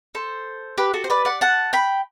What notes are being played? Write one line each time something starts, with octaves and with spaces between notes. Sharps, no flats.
A4 C5
G4 B4
F#4 A4
C5
B4 D5
D5 F#5
F#5 A5
G5 B5